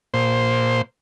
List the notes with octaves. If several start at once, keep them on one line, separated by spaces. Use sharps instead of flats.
A#2 C5